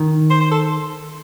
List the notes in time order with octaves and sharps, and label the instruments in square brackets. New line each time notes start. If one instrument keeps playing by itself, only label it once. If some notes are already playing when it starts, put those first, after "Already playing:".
Already playing: [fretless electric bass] D#3
[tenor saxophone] C5
C5
A4